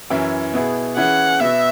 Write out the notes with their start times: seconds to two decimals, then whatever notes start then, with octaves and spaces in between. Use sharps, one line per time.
0.10 F#2 E3 C#4 E4
0.53 B2 B3 E4 G#4
0.97 E3 C#4 E4 G#4 F#5
1.40 B2 B3 F#4 E5